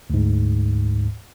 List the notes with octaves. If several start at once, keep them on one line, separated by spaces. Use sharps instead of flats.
D2 G#2